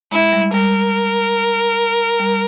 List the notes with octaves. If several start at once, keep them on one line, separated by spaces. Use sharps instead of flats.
G#3 E4
G3
G3 A#4
G3